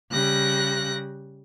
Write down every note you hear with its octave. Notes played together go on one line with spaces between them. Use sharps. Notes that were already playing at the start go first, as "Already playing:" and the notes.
C#3 G3 F#6 A#6